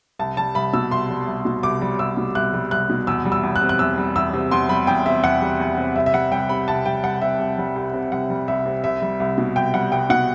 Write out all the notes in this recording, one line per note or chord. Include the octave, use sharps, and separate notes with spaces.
C2 A5
G3 A5
C2 B5
B2 E6
C2 C6
G3
C2
B2
C2 D6
G3
C2 E6
B2
C2 F#6
G3
C2 F#6
B2
E2 E6
G3
E6
E2
F#6
C3
F#6
E2 E6
G3
E2 E6
C3
E2 C6
G3 B5
E2 G5
C3 E5
E2 F#5
G3
E2
C3
C2 E5
E5
G3 F#5
C2 G5
C3 B5
C2 A5
G3 G5
C2 F#5
C3 E5
C2
G3
C2
C3
C2 F#5
G3
C2 E5
C3
C2 E5
G3
C2
B2
C2 G5
G3 F#5
C2 G5
B2 F#5